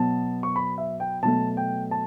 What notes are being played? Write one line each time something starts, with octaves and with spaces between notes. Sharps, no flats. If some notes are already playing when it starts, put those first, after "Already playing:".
Already playing: B2 F#3 B3 A5
C#6
B5
E5
G5
B2 F#3 A3 A5
G5
A5